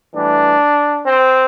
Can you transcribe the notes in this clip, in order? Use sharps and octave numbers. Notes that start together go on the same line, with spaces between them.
A2 E3 G3 D4
C4